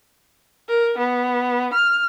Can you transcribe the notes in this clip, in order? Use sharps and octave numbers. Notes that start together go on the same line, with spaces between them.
A#4
B3
F6